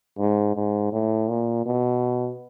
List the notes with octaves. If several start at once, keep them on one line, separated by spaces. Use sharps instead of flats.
G#2
G#2
A2
A#2
B2